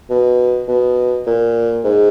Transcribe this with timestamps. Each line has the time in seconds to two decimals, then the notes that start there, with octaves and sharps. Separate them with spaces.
0.10 B2
0.68 B2
1.26 A#2
1.84 G#2